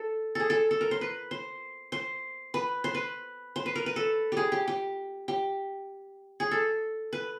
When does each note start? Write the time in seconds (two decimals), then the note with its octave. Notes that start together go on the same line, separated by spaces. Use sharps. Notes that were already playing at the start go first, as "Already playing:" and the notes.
Already playing: A4
0.35 G#4 A4
0.50 A4
0.71 A4
0.81 A#4
0.91 C5
1.01 B4
1.31 C5
1.92 C5
2.54 B4
2.84 C5
2.95 B4
3.56 C5
3.66 B4
3.75 A#4
3.86 B4
3.96 A4
4.32 G4 G#4
4.52 G4
4.68 G4
5.28 G4
6.40 G#4
6.51 A4
7.13 B4